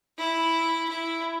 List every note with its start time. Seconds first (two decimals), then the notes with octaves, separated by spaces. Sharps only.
0.19 E4
0.89 E4